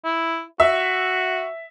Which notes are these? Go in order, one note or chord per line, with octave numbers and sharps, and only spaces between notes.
E4
F#4 E5